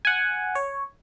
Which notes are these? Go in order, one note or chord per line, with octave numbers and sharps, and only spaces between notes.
F#5 G#5
C#5